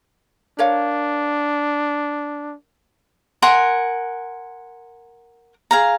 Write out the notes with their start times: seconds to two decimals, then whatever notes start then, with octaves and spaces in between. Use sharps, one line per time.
0.59 D4 A#4 C#5 F5
3.42 A#4 F#5 G#5 C6
5.71 G#4 F5 A#5